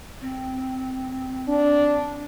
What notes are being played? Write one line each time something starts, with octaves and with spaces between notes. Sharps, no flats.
C4
D4